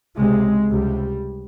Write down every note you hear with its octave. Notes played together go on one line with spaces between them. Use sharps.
C#2 C3 G#3
C#2 C3 G3